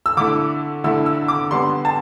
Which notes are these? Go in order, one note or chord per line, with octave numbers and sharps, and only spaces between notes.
E6
D3 A3 E4 D6
D3 A3 E4 E6
E6
D6
D3 G3 B3 D4 C6
A5